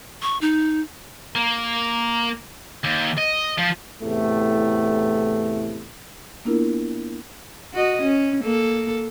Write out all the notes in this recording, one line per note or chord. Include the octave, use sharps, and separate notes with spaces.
C#6
D#4
A#3
D#2
D#5
F3
E2 A2 C3 A3
A#3 B3 D4 E4 F4 A#4
F#4 D#5
C#4
A#3 A4